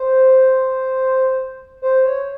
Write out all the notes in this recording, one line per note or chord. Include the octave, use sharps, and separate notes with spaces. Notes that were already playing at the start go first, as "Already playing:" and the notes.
Already playing: C5
C5
C#5